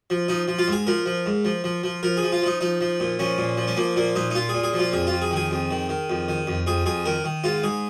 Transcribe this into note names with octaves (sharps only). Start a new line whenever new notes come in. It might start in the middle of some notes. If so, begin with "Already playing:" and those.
F3
F3 D#4
F3
F4
G#2 G#4
F3 A#4
F3
G#2
F3
F3
F3
F3 A#4
G#4
F3
F4
F3 D#4
F3 D#4
F3
A#2
F3 C#4
A#2
F3
C#4
F3 A#3
A#2 A#3
A#2 D#4
D#4
A#2 F4
A#2 G#4
G#4
F3
F4
F2 G#4
F2 F4
G#4
D#3
G#4
F2
D#3
D#3
F2
D#3
F2
F2 G#4
F2 G#4
D#3 A#4
D#3
G#2 F4
G#2 G#4